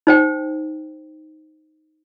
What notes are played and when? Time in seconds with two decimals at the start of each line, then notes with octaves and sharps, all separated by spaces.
0.07 D#4 C5 G5